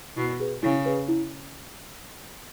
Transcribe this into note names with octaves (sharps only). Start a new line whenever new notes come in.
B2 E4
G#4 B4
C#3 E4
G#4 B4
E4